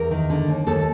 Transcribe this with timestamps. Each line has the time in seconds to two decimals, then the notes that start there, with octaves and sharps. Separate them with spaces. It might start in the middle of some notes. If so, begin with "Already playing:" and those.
Already playing: E2 A#4
0.11 D#3
0.30 D3
0.48 D#2
0.67 D#2 A4